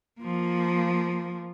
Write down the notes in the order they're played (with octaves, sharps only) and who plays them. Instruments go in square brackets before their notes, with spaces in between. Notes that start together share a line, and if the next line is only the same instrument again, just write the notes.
[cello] F3 A#3